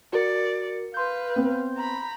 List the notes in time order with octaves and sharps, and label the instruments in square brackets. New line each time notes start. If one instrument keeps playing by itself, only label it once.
[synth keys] F#4 A#4 C#7 [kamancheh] D5
[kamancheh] B4 F5 [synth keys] C6 G6
[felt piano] B3 C4
[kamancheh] A#5 B5